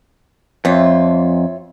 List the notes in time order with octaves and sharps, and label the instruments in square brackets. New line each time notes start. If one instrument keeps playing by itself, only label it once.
[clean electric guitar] F2 [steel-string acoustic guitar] F4 C#5 E5